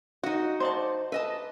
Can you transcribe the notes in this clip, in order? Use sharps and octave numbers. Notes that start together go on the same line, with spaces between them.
D#4 F#4 F#5
C5 D5 A5
B4 D#5 E5 A5